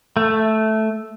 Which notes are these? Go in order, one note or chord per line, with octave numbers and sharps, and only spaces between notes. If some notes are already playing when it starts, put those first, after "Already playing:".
A3